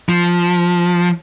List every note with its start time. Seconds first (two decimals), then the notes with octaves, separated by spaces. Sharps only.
0.09 F3